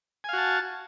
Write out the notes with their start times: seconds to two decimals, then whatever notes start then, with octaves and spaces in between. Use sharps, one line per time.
0.24 G#5
0.29 F5
0.33 F#4
0.38 A5